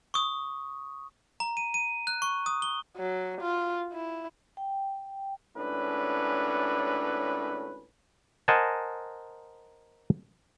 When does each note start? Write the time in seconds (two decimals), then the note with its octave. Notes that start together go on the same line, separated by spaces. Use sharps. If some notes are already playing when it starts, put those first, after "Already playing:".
0.14 C#6 D#6
1.40 A#5
1.57 D#7
1.74 D#7
2.07 F#6
2.22 C#6
2.46 D#6
2.62 G7
2.97 F#3
3.41 F4
3.93 E4
4.57 G5
5.55 G#1 A2 C#4 D4 B4
8.48 A#4 C5 D#5 F#5 G#5 A5